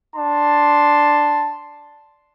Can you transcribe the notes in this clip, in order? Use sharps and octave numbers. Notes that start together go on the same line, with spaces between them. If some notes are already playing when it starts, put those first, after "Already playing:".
D4 A5 C6